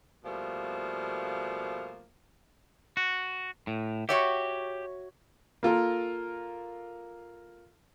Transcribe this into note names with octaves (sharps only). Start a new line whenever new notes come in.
B2 F3 G3 A3 A#3
F#4
A2
F#4 G4 C#5 E5
A#3 F4 A4 A#4